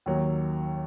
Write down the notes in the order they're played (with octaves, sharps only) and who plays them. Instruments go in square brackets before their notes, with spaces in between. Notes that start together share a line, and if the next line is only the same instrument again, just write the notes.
[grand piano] D#2 D#3 F#3